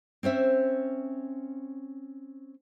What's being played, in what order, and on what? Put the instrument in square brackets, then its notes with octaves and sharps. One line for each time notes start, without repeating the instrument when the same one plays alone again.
[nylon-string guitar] C4 C#4 C5 E5